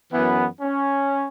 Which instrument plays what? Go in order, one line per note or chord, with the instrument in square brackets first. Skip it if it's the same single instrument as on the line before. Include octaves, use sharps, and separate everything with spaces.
[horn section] F#2 E3 B3
C#4